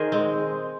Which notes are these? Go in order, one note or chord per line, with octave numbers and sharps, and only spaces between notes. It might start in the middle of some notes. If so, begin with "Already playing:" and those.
Already playing: D#3 G#4 A#4 C5
G#3 C4